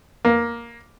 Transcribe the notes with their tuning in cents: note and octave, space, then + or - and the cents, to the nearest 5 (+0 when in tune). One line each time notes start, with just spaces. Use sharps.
A#3 +5